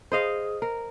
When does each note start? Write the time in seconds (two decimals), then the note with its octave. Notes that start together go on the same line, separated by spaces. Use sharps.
0.12 G#4 C5 D#5 F5
0.62 A#4